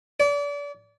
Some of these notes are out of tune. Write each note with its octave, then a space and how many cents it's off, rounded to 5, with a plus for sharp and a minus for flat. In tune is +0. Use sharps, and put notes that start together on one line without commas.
D5 -35